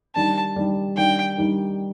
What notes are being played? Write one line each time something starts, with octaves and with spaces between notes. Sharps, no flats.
D#3 G3 D4 A5
D#3 G3 D4
D#3 G3 D4 G5
D#3 G3 D4